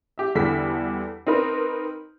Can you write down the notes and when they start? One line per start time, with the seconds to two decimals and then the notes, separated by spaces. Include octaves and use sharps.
0.18 G4 E5
0.35 E2 D3 G3 B6
1.27 C4 D#4 A#4 B4